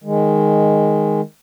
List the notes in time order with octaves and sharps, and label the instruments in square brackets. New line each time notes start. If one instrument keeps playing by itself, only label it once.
[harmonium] D#3 G#3